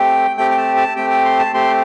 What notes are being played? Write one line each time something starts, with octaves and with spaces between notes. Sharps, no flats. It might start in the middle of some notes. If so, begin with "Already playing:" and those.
Already playing: A3 C4 G4 G5
A3 C4 G4 G5
G5
A5
A5
A3 C4 G4 G5
G5
C6
A5
A3 C4 G4 C6